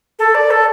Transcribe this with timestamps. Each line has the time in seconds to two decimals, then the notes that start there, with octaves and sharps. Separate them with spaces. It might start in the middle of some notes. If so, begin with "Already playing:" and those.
0.19 A4
0.35 D5
0.50 A4